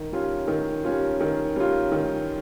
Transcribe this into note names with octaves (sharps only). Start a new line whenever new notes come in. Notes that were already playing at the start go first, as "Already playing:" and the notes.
Already playing: D#3
G3 C#4 F4
D#3
G3 C#4 F4
D#3
G3 C#4 F4
D#3